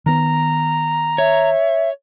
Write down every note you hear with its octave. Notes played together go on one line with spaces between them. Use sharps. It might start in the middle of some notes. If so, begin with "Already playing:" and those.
D#3 B3 A#5
C#5 E5